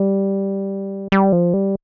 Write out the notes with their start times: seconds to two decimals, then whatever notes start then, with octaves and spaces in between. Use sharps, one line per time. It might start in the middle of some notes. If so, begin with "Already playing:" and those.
Already playing: G3
1.12 G3
1.32 F3
1.54 G3